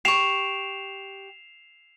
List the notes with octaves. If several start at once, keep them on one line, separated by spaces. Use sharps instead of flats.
G4 C#6 C7 E7 F7